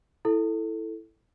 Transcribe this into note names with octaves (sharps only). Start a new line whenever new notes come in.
E4 A4